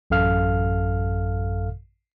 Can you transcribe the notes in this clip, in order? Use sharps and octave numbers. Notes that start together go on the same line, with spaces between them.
A1 F#2 A4 F5 F6